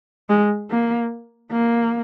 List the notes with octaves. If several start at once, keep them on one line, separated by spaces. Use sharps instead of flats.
G#3
A#3
A#3